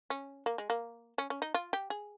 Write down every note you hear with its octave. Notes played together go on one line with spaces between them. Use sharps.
C#4
A#3
G#3
A#3
C#4
C#4
D#4
F4
G4
G#4